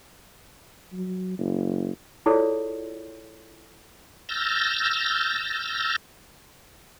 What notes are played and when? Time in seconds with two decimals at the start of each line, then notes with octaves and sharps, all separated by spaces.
0.92 F#3
1.38 F#1
2.26 E4 F4 G#4 A4 C#5 D5
4.29 E6 F6 G6 A6 A#6